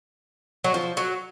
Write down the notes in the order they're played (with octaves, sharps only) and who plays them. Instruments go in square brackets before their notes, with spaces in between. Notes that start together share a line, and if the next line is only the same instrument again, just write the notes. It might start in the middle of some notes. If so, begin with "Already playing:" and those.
[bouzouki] F#3
F3
F#3